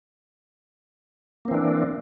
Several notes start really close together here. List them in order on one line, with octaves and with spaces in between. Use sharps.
A#3 C4 E3 D4